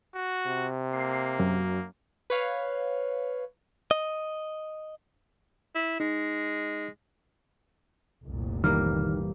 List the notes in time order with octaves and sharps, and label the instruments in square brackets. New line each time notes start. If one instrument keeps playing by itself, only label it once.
[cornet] F#4
[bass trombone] C3
[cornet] A#3 [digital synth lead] C7
[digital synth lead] F#2
[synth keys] B4 C#5 F5
[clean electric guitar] D#5
[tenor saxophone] E4
[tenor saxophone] G#3 [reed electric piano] D#4
[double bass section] F1 C2 A#2
[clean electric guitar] D#3 [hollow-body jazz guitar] E3 G3 A#3 [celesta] F6